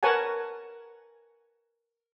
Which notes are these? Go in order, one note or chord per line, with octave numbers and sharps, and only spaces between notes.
A#4 B4 C#5 F#5 G#5 A5